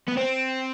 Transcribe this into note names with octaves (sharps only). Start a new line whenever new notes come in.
B3
C4